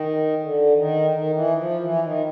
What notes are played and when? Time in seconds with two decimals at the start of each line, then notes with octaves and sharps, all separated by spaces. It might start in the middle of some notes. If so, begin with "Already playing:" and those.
Already playing: D#3
0.42 D3
0.75 D#3
1.11 D#3
1.33 E3
1.56 F3
1.80 E3
2.02 D#3